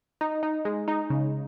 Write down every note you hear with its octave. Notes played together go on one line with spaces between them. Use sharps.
D#4
D#4
G#3
D#4
C#3